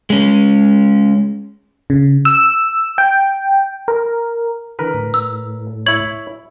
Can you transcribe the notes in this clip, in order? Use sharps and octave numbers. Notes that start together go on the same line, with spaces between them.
G#3 C#4
C#3
E6
G5
A#4
D3 E3 A#4 B4
A2
E6
E4 C#5 G#6 F#7